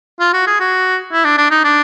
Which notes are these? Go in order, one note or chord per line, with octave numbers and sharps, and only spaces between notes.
F4
F#4
G#4
F#4
E4
D4
D4
D#4
D4